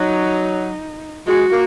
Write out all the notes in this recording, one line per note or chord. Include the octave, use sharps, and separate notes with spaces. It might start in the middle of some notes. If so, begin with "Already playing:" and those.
Already playing: F#3 D#4
G#3 F#4
A#3